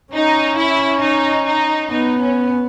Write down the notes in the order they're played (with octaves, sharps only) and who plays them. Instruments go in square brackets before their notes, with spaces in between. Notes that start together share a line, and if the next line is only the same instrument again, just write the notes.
[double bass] C#4 [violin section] D#4
[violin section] E4
D#4
D#4
[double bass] B3 [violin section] D#4
[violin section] C#4